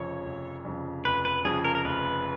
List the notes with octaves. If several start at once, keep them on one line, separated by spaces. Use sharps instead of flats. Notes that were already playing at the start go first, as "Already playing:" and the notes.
Already playing: F1 F2 C#3 F3 C#5
F1
F2 C#3 F3
F1 B4
B4
F2 C#3 F3 G#4
A#4
A#4
F1 B4